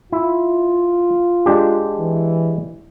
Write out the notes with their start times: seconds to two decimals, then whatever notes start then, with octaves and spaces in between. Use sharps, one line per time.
0.12 E4 F4
1.46 G#3 D4 G4
1.98 E3